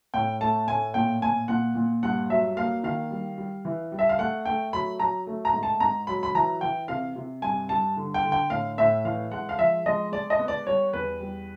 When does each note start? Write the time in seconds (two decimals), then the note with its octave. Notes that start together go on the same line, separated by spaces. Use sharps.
0.14 A2 G5
0.41 A3 A5
0.67 A2 G#5
0.94 A#2 G5
1.21 A#2 G#5
1.48 A#2 F#5
1.75 A#2
2.03 G2 F#5
2.30 F#3 E5
2.57 A#3 F5
2.84 D#3 F5
3.11 G3
3.38 G3
3.65 E3
3.92 G3
3.99 E5
4.09 F5
4.19 A3 F#5
4.45 A3 G5
4.73 F#3 B5
5.00 F#3 A#5
5.27 A3
5.45 A#5
5.53 G#2
5.63 A5
5.80 G#2 A#5
6.07 F#3 B5
6.23 B5
6.35 E3 A#5
6.61 E3 G5
6.88 C3 F5
7.16 C3
7.42 G2 G#5
7.69 G2 A5
7.97 D3
8.14 G5
8.23 D3
8.32 G5
8.50 A2 F5
8.78 A2 E5
9.05 E3 F5
9.31 G#3 F#5
9.49 F5
9.59 F3 E5
9.86 G#3 D#5
10.12 G#3 D5
10.30 D#5
10.39 B3
10.48 D5
10.67 G3 C#5
10.93 E2 B4
11.21 G3